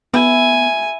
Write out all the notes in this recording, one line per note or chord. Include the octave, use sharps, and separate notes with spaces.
B3 E4 G#5